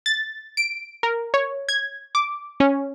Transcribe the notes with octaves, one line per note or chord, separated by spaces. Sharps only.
A6
D7
A#4
C#5
G#6
D6
C#4